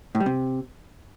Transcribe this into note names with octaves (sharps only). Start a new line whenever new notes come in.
A2
G3
C3